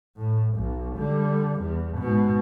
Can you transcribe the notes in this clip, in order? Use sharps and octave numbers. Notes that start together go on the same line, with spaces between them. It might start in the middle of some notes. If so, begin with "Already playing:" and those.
A2
B1
D3 G3
E2
G#2 B2